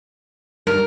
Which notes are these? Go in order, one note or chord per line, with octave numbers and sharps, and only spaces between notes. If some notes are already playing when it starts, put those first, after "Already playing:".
G2 A#4